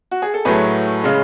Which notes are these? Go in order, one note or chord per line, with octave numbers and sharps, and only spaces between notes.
F#4
G#4
A4
A2 F#3 A3 G#4 B4
C#3 G#3